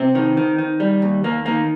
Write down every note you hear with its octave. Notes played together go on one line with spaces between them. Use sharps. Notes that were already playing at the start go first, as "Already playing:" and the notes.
Already playing: C3 C4
D#3
D#3
D#3
G3
D#2
D#2 A#3
D#3 A#3